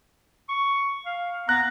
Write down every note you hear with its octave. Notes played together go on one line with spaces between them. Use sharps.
C#6
F5
B3 A#5 F#6